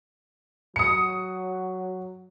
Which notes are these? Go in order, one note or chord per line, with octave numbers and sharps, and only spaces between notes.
F#3 D#6 C#7